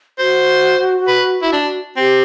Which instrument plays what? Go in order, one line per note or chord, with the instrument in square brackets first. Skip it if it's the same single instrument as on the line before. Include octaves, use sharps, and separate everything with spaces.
[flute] F#4 [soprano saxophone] C5
[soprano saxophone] B4
E4
D4
[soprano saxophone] C4 [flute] G4